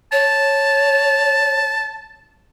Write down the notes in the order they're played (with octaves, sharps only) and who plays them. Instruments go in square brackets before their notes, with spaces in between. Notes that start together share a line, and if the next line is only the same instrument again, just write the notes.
[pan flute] C#5 [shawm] A5